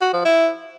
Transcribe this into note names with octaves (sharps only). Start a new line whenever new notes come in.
F#4
F3
E4